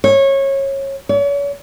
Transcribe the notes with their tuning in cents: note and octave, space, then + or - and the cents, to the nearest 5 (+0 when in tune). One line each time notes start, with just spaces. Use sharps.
C#5 -20
C#5 +40